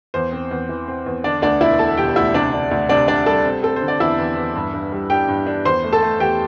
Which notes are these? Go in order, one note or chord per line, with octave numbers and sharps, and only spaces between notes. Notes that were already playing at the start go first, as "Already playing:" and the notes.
E2 C5
C4
E2
E3
C4
E2
D3 D4 D5
D2 D4 D5
E1 E4 E5
E1 A4 A5
E1 G4 G5
D2 E4 E5
C3 D4 D5
D4
D2
C3 D4 D5
C3 D4 D5
G3 A4 A5
C4
C4 A4
C5
D3
D5
E2 E4 E5
E2
E2
G2
G2
G3
D4 G4 G5
G2
D4
E2 C5 C6
A3
A4 A5
A3
E2 G4 G5